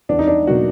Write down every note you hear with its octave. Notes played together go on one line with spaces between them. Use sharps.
E2 D4
D#4
D4
B2 F#3 A#3 F#4